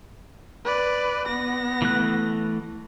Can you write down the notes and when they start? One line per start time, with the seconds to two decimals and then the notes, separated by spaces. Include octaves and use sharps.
0.65 B4 D5
1.28 B3 A#6
1.82 E3 A3 F#6